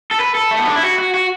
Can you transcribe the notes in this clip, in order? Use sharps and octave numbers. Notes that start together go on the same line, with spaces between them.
A4
B4
A4
A3
B3
D4
E4
F#4
F#4
F#4